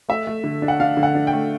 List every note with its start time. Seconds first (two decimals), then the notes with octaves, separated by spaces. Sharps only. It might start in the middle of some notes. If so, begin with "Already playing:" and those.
0.09 A3 E5
0.27 A3
0.44 D3
0.62 D4
0.68 F#5
0.80 D4 F5
0.97 D3
1.03 F#5
1.15 D4
1.27 G5
1.33 A3